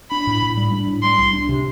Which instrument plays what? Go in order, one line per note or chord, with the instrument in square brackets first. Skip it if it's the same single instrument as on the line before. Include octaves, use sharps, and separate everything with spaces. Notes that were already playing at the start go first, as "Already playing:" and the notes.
[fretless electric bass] D4 [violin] B5
[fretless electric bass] A2
A2
G3
D4
A2
[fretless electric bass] G3 [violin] C6
[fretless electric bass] C2
D4
C3